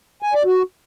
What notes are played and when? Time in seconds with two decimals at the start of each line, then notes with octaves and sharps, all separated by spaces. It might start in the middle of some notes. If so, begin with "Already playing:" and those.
0.23 G#5
0.34 D5
0.45 F#4